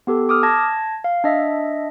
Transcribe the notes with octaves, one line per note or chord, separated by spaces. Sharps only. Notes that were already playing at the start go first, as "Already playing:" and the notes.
B3 G4 A4
D6 D#6 F6
A5 G#6 A#6
F5
D4 D#5 E5